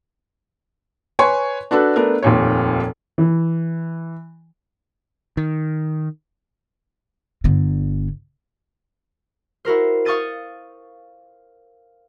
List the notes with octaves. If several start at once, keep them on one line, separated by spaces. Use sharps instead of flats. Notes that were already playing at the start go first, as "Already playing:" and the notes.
B4 C#5 G#5 C6 C#6
D4 F#4 A4 B4
A3 B3 D4 A#4
F1 D#2 A#2 C#5
E3
D#3
G1 D3
E4 F#4 A#4 C5
F5 C#6 D#6 G6 A6 D#7